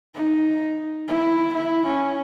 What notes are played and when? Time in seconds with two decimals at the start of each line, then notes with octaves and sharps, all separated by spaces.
0.15 D#4
1.08 E4
1.53 E4
1.85 C#4